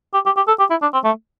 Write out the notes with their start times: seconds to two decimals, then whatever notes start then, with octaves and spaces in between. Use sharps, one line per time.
0.14 G4
0.26 G4
0.37 G4
0.48 A4
0.59 G4
0.71 E4
0.82 D4
0.93 C4
1.04 A3